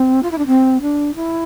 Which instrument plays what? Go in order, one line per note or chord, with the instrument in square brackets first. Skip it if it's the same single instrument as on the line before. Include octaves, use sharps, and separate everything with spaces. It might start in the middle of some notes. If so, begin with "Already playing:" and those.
Already playing: [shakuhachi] C4
F4
E4
D4
C4
D4
E4